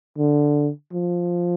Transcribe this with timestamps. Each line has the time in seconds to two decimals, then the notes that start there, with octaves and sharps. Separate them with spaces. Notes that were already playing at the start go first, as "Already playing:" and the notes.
0.18 D3
0.93 F3